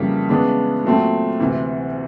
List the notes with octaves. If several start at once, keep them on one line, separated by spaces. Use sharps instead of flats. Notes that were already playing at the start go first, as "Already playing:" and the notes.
Already playing: F2 C#3 E3 G3 A#3
C#3 E3 G#3 B3 D4
A#2 F#3 A3 C4
D2 C3 E3